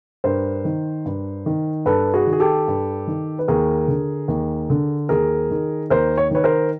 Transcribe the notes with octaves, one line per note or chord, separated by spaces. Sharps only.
G2 A#4 C5
D#3
G2
D#3
G2 A4 B4
F#4 G#4
D#3
G#4
G4 A4
G2
D#3
B4
D#2 G#4 A#4
D3
D#2
D3
D#2 G#4 A#4
D#3
D#2 A#4 C5
C#5
D#3 B4 C#5
A#4 C5